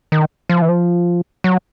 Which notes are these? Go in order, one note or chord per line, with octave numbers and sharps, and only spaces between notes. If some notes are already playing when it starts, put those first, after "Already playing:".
D#3
F3
E3
F3
F#3